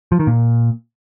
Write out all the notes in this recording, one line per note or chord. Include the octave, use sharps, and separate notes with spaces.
F3
D#3
A#2